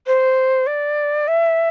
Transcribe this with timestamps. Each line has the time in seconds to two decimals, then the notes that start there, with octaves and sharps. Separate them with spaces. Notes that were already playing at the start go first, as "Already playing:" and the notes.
0.07 C5
0.67 D5
1.28 E5